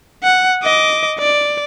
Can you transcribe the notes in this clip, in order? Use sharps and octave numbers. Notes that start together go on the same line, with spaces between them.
F#5
D#5 D6
D5